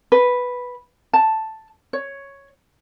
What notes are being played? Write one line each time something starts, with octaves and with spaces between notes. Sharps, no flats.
B4
A5
C#5